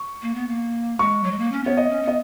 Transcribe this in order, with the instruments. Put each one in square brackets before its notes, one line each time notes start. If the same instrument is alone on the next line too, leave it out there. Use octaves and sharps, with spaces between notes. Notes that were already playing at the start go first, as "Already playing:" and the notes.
Already playing: [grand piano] C#6
[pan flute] A#3
B3
A#3
[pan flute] G#3 [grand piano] C#6
[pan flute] F#3
G#3
A#3
C#4
[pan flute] B3 [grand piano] C#5
[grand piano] D#5
[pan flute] C#4
[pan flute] B3 [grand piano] D#5